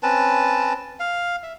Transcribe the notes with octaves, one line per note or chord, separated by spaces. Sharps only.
C4 C#4 B4 A5
F5
E5